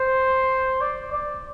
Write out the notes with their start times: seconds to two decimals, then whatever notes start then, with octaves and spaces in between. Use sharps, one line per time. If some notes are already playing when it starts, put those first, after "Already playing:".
Already playing: C5
0.81 D5
1.12 D5